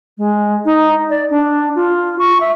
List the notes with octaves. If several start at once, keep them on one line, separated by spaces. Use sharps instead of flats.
G#3
D#4
D5
D4
F4
C#6
E5